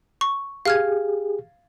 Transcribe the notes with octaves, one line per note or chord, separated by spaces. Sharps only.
C#6
G4 G#4 F5 F6 G#6